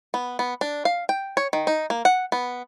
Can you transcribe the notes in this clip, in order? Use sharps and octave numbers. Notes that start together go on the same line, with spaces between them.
B3
B3
D4
F5
G5
C#5
D#3
D#4
A#3
F#5
B3